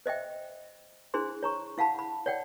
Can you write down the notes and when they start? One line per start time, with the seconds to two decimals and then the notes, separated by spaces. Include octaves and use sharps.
0.06 C5 D#5 E5 G5
1.14 D4 E4 G#4 C5 C6
1.43 C#5 A#5 C#6
1.78 E4 F5 F#5 A5 B5
1.99 B5
2.26 C#5 D5 F#5 G5